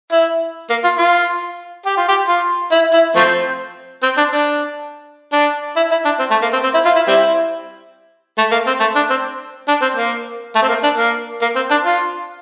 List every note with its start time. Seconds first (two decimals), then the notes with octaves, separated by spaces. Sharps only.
0.12 E4
0.70 A#3
0.84 F4
0.98 F4
1.86 G4
1.97 F4
2.08 G4
2.28 F4
2.72 E4
2.93 E4
3.16 F3 A3 C4
4.03 C4
4.18 D4
4.31 D4
5.33 D4
5.76 E4
5.91 E4
6.05 D4
6.19 C4
6.31 A3
6.42 A#3
6.53 C4
6.64 C4
6.74 E4
6.85 F4
6.96 E4
7.07 G3 C4 E4
8.38 A3
8.51 A#3
8.67 C4
8.80 A3
8.95 D4
9.10 C4
9.68 D4
9.81 C4
9.96 A#3
10.55 A3
10.62 C4
10.68 A#3
10.83 D4
10.97 A#3
11.42 A#3
11.55 C4
11.70 D4
11.85 F4